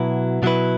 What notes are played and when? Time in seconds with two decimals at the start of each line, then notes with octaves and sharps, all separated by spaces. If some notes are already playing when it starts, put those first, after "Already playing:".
Already playing: B2 F#3 E4 B4
0.42 B2 F#3 E4 B4